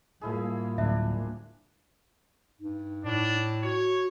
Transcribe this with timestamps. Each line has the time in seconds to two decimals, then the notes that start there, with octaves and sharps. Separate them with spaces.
0.21 A2 F3 G3 A#3 E4 G#4
0.78 D1 D4 E5
2.60 G2 D#4
3.05 A2 D4
3.63 F#4 C#5